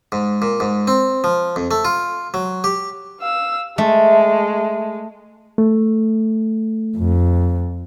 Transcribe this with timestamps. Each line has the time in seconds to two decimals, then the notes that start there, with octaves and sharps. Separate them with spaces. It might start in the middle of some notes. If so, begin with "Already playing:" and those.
0.12 G#2
0.42 A#2
0.60 G#2
0.88 C4
1.24 F3
1.56 F2
1.71 A3
1.85 F4
2.34 F#3
2.64 G4
3.20 F5 E6
3.78 G#3 A3
5.58 A3
6.97 F2